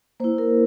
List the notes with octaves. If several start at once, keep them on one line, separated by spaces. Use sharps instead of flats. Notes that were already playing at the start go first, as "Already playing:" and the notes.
A#3 E4 C5
A#4